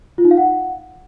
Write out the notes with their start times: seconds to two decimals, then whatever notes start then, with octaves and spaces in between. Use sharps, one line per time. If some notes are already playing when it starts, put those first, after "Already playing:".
0.18 F4
0.25 D#4
0.31 F5
0.37 F#5